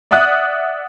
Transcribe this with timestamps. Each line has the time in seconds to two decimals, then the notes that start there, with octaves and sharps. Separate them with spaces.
0.11 D5 E5 F#5 D#6 F#6